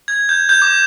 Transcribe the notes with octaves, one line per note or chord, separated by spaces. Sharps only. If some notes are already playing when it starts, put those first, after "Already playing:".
G#6
G6
G6
D6